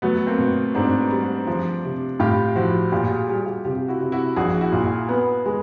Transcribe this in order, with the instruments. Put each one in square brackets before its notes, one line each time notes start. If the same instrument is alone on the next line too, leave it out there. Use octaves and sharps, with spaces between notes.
[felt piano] F#3 [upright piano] A3 B3
[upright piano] A#3 C4
[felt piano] B2
[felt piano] G#2 [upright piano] C4 D4
[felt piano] G3
F3
C3
[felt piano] A2 [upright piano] F4 G4
[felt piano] F3 [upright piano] E4 F#4
[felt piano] A#2 [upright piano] F4 G4
[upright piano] F#4 G#4
[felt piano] G3 [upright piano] F#4 G#4
[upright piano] F4 G4
[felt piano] C3 [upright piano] F4 G4
[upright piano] E4 F#4
[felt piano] C3
[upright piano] E4 F#4
[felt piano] A#1 [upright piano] F#4 G#4
[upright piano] E4 F#4
[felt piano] A#2
[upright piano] E4 F#4
[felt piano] B3
G#3